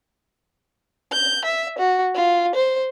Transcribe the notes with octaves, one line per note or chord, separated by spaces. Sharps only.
G6
E5
F#4
F4
C5